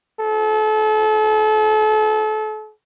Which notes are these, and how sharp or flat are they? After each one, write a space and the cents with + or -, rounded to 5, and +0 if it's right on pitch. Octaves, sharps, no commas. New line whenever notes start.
A4 -35